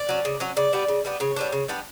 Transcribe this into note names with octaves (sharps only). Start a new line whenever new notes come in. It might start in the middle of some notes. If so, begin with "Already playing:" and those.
Already playing: D5
F#3 C#4
C#3
F#3 C#4
C#3 D5
G3 B3 D4
C#3
G3 B3 D4
C#3 C#5
G3 B3 D4
C#3
G3 B3 D4